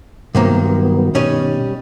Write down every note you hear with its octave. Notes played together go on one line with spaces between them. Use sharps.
G2 C3 D#3 F#3 A#3 B3
B2 D#3 G3 C#4 D#5